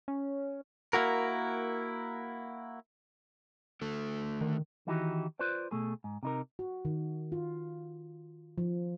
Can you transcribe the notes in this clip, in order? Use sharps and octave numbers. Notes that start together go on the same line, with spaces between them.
C#4
A#3 E4 F#4 A#4
D3 A3
D#3
D#3 E3 D#4 E4 F#4 G4
F4 B4 C5 D5
B2 A3 G#4
G#2
C3 D#4 A#4
F#4
D#3
F4
F3